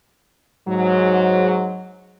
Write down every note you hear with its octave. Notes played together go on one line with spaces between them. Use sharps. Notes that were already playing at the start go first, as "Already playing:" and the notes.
G#2 F#3